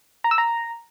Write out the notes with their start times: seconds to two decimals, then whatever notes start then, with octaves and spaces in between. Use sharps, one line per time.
0.24 A#5
0.31 E6
0.38 A#5